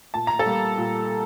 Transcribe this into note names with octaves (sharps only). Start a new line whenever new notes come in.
A#2 A5
A#5
A4 A5
G3 A#3
A#2